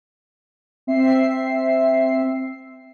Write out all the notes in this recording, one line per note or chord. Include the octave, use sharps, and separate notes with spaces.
C4 E5 C7